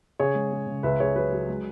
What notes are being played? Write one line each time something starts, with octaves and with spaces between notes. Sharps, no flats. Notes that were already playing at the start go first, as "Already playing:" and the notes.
C#3 G#4 C#5
G#3
G#3
C#3
C#2 B4 E5
C#2 G#4 C#5
F#3 B4
F#3
G#3